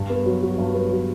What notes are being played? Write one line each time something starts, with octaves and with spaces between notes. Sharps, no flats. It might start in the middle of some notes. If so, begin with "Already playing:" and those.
Already playing: G2
B3
F#3
F#4
G2
B3
F#3